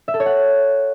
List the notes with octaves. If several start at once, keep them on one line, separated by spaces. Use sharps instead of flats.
E5
A4
C#5
F#5